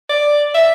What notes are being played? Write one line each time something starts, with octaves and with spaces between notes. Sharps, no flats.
D5
E5